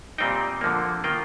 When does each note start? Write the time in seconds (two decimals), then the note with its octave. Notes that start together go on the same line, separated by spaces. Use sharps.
0.18 A#2 G3 C4 D#4 G5
0.61 D3 F3 A#3
1.04 D#3 A#3 F4 G5